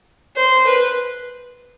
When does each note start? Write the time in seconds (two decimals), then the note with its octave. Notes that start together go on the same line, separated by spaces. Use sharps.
0.36 C5
0.66 B4